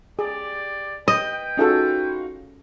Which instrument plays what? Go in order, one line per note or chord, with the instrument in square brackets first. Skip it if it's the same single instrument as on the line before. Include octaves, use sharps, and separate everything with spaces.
[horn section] G4 D5 [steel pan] G#4
[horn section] B4 G5 [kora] D#5
[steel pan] C#4 G#4 A4 [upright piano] D#4 F4 F#4